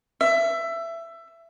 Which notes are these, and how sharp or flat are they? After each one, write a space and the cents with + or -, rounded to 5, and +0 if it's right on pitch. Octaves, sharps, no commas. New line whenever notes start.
E5 +20